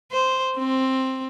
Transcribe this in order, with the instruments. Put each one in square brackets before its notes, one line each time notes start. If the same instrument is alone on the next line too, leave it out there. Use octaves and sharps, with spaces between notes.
[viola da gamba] C5
C4